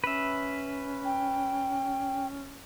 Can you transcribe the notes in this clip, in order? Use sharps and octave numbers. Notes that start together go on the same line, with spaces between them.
C#4 B4 E5
G5